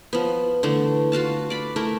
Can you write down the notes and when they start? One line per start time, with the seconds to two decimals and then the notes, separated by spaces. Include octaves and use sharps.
0.13 F3 B3
0.63 D3 E3 A3
1.12 F4 F#4 F5 A5
1.50 D5 B5
1.76 A3 E4 A#4